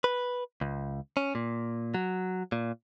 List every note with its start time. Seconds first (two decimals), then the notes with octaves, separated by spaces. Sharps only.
0.04 B4
0.61 C#2
1.17 C#4
1.35 A#2
1.94 F#3
2.52 A#2